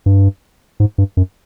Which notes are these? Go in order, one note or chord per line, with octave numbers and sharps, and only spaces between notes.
G2
G#2
G2
F#2